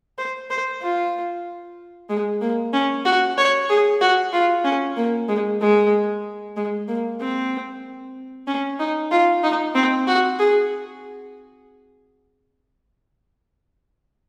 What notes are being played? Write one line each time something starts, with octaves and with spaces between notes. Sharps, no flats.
C5
C5
F4
G#3
A#3
C#4
F#4
C#5
G#4
F#4
F4
C#4
A#3
G#3
G#3
G#3
A#3
C4
C#4
D#4
F4
D#4
C4
F#4
G#4